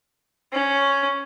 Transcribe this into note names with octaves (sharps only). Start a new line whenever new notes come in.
C#4